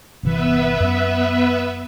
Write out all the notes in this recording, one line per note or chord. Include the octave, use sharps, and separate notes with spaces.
G1 C3 E3 B3 B4 E5
F#2